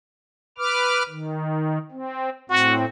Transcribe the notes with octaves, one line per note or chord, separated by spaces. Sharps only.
B4 D6 F6
D#3
C4
A2 C4 F#4